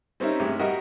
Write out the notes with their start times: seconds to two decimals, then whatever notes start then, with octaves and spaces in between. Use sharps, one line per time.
0.20 G3 C4 C#4 D#4 A#4 E5
0.40 A1 G2 C3 G#3
0.59 G3 F#4 A#4 D#5 E5 F#5